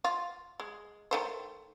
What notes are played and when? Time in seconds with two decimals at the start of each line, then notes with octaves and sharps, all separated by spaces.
0.04 F4
0.60 G#3
1.11 D#3 A3 C5